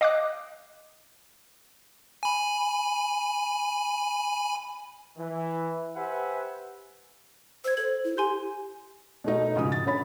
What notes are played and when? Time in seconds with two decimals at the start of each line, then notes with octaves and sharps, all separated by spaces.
0.01 D#5 F5 D6 D#6 F#6
2.23 G#5 B5
5.18 E3
5.97 G4 B4 C5 E5 F#5 G#5
7.64 C5 E6 G#6
7.77 A4 C5 G#6 F#7
8.04 E4
8.17 G4 G#5 C6 G6
9.24 B2 A3 D#4
9.56 G#2 C#3 F3 D#6
9.72 A6
9.86 D3 C#4 C#5 B5 A6